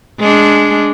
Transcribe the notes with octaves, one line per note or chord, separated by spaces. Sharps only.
G#3 D4